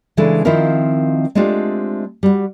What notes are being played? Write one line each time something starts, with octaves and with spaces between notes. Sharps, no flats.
C#3 E3 G#3 D4 A4
D#3 F3 C4 E4 F4 A#4
G#3 A3 C4 D4 F4 G4
G3 F#4